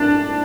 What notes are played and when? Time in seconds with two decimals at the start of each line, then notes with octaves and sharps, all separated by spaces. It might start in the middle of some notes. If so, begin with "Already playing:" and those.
Already playing: D4